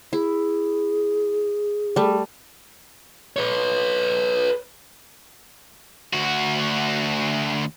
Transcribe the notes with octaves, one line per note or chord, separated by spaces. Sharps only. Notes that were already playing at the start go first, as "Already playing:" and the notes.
E4 G#4
G3 A3
B4 C#5
D2 F#4